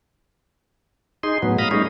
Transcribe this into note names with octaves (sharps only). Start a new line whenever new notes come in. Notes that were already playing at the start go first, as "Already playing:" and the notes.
D#4 G#4 C6
A2 F#3 B3
F5 A#5 B5 D#6
G3 A3 C#4 D#4 G#4